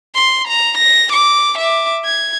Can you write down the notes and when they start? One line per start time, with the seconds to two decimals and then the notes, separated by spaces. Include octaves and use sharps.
0.15 C6
0.48 A#5
0.78 A#6
1.13 D6
1.58 E5 D6
2.05 G#6